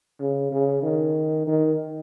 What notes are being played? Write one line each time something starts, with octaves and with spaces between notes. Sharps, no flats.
C#3
C#3
D#3
D#3